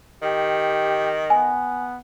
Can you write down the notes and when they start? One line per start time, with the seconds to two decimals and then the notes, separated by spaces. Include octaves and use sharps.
0.22 D#3 G4
1.30 B3 G#5